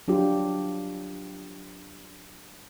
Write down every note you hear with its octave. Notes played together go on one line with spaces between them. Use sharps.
F#3 D4 F4 G4